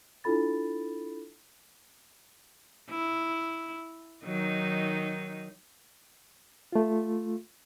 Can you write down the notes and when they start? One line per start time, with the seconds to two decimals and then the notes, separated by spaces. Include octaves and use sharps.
0.24 D4 E4 F4 A4 B5 A6
2.90 E4
4.25 D#3 F#3 D#4
6.72 A3 F4